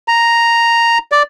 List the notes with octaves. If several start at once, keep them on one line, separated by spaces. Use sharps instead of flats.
A#5
D5